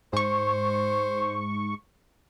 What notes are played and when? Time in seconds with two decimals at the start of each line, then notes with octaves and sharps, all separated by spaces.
0.13 G#2 C5 C#6